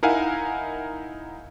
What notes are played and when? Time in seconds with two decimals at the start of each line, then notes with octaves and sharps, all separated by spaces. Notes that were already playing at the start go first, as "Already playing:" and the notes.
0.03 D#4 E4 A#4 F5 F#5 G#5